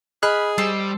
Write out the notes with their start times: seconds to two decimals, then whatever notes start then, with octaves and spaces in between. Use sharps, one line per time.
0.23 G#4 D#5 B5 F6 F#6
0.58 G3 A4 C5